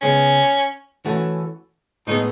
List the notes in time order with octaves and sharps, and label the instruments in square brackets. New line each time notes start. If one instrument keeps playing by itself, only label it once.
[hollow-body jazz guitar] C#3 G#3 B3 [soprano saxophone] C#4
[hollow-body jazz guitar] E3 A3 C#4 F#4
[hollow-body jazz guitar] A2 G#3 B3 [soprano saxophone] D#4